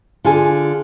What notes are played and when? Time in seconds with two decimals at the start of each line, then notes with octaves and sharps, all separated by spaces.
0.24 D3 F4 G#4 G#5